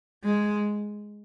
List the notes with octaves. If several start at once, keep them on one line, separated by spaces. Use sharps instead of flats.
G#3